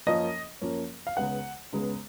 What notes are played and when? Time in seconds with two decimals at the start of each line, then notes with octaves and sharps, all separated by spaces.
0.07 F#2 F3 A#3 C#4 D#5
0.61 F#2 F3 A#3 C#4
1.07 F5
1.17 C#2 C#3 G#3 B3 F#5
1.72 C#2 C#3 G#3 B3